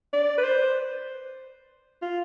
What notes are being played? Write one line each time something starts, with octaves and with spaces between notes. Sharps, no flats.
D5
B4
C5
F4